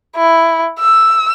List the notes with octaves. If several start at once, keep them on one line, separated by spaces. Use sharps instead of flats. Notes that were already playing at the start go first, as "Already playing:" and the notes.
E4
E6